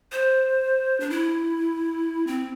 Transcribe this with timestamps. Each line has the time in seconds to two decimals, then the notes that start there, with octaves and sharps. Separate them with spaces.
0.12 C5
1.00 D4
1.10 E4
2.27 C4